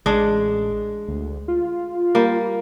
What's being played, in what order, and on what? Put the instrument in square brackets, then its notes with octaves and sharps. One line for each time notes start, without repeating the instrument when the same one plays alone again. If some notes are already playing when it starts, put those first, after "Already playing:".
[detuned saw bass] A1 [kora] G#3 D4
[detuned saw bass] D2
F4
[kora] G3 A#3